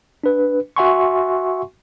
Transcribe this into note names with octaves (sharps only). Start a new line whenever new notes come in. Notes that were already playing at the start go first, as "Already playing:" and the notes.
D4 B4
F#4 E5 F#5 G#5 C6 C#6